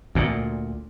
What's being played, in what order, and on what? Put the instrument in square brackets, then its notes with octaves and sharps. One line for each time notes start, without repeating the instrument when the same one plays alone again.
[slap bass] D2 A#2